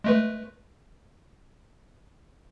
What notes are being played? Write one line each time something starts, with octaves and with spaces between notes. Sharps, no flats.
G#3 A3 B4